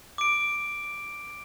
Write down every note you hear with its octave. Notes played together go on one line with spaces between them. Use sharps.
D6 D7